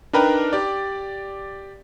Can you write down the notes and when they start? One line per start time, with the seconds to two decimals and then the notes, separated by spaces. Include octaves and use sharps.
0.13 D4 D#4 A#4 B4 G5 A#5
0.53 G4 D5